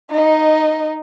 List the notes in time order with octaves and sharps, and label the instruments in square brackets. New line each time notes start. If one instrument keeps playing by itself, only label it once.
[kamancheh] D#4 D#5